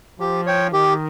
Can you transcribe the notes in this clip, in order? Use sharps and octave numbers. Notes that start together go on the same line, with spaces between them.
F3 G4
C#5 G5
D#3 G4